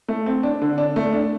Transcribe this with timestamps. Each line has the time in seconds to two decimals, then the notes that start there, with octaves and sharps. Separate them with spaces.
0.08 A3
0.26 C4
0.43 D4
0.62 D3
0.78 D4
0.96 A3
1.13 D4